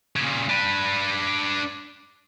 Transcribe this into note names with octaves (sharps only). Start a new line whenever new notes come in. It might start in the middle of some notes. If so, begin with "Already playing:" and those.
A#2 C#3
D4 B4